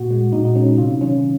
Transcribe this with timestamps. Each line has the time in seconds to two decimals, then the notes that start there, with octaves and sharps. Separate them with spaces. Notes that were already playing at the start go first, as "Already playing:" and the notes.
Already playing: A#2 F#4
0.11 G#3
0.33 A#2 D#4
0.45 D#4
0.55 G#3 C#4
0.67 D#4
0.78 C3 F4
1.01 D#3 F#3 C#4